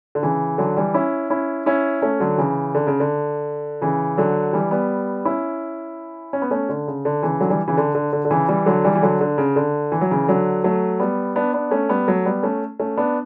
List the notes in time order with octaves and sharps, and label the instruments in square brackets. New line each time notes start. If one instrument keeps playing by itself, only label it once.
[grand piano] D3
C#3 E3
D3 F#3
E3 G3
C#4 E4
C#4 E4
C#4 E4
A3 C#4
D3 F#3
C#3 E3
D3
C#3
D3
C#3 E3
D3 F#3
E3 G3
G3 B3
C#4 E4
C#4
B3
A3 C#4
D3
C#3
D3
C#3 E3
D3 F#3
E3 G3
C#3 E3
D3
D3
D3
D3
C#3 E3
E3 G3
D3 F#3
E3 G3
E3
D3 F#3
D3
C#3
D3
E3
F#3
C#3 E3
D3 F#3
F#3 A3
G3 B3
B3 D4
B3 D4
A3 C#4
G3 B3
F#3 A3
G3 B3
A3 C#4
A3 C#4
B3 D4